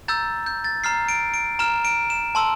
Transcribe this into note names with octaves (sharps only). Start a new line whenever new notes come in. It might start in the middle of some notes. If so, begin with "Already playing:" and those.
A#5 E6 G6 A6
G6
A6
A#5 F6 C7
D7
D7
A#5 F6 E7
D7
E7
A5 C6 E6